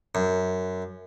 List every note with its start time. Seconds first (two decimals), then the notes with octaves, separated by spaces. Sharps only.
0.15 F#2